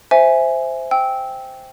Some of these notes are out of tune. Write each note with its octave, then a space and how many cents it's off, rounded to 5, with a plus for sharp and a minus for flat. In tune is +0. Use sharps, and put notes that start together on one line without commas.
C5 -5 E5 +0 G#5 +0
G5 +0 E6 -15